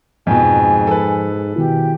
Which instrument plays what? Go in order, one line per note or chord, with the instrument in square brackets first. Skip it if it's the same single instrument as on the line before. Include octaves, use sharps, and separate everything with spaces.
[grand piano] F2 B2 [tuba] G#2 [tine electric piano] F3 [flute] G#5
[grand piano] A4 B4
[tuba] B2 [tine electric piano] D#3 E4 [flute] G4